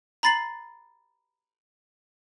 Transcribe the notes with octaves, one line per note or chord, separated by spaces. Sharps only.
A#5 B5 A6 C7 F#7